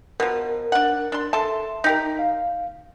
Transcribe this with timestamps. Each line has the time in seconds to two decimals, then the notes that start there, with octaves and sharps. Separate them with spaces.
0.20 B2 F3 A#4
0.72 D4 F#5
1.12 D4 C6
1.33 A4 E5 A5 C6
1.84 D#4 G4 A#4
2.19 F5